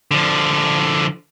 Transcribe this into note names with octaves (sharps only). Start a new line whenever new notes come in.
D3 F3